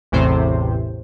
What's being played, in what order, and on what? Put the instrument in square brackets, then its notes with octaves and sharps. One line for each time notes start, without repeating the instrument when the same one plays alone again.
[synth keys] A1 E2 A2 C3 C5